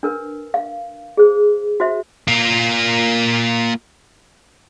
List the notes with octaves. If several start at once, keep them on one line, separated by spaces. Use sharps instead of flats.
D4 A#4 B4
F5
G#4 C5
F#4 C5 E5
A#3 F4